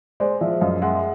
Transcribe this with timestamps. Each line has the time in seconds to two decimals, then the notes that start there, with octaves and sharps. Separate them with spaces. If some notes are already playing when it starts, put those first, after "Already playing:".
0.20 G#3 C5 D5
0.40 F3 D5 E5
0.61 F#2 D#5 F5
0.82 G#3 E5 F#5